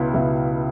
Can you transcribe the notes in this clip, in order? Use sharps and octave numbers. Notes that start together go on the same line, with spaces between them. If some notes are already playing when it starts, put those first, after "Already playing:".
Already playing: C#2 B2 B3 E4
C#2 B2 B3 E4